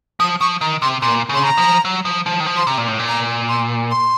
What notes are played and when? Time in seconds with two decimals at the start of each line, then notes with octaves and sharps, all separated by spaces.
0.20 F3 D#6
0.41 F3 C#6
0.61 D#3 A#5
0.82 C3 C6
1.02 A#2 C6
1.29 C#3 C6
1.44 A#5
1.58 F3
1.85 F#3
2.05 F3
2.26 F3
2.40 D#3
2.46 F3
2.57 C6
2.67 C3 A#5
2.78 A#2
2.88 A2
2.99 A#2
3.08 A#5
3.49 C6
3.91 C6